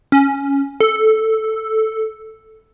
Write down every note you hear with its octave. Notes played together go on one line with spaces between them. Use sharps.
C#4
A4